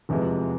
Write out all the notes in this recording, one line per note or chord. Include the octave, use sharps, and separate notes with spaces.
F1 E2 C3 F3 G#3